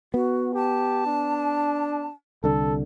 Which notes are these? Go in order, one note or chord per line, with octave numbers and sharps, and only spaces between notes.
B3 F#4
G4 A5
D4
C2 D3 A4